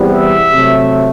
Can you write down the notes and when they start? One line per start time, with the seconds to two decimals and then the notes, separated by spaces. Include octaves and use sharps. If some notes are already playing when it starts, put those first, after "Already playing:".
Already playing: E2 C3 G3 B3
0.11 E5
0.50 C3 F#3 A3